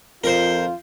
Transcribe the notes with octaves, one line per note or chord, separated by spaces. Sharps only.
F2 F4 A#4 C5